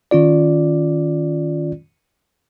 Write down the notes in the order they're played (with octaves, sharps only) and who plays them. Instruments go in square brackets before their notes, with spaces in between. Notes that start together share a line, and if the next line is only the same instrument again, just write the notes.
[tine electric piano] D#3 C#4 F4 D5